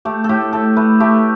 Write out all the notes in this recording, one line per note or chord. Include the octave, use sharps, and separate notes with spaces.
A3 G4
A4
A2 G4
A2 A4
A3 B4
A3 G4